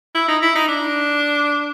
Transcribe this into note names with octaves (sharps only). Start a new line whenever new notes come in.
E4
D#4
E4
D#4
D4